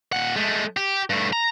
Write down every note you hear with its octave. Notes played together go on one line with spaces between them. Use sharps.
A#2 F#5
G#3 A3
G4
G2 A3
A#5